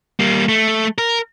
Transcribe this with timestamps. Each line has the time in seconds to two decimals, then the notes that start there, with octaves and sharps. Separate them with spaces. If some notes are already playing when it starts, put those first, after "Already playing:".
0.20 G3 A#3
0.49 A3
0.98 A#4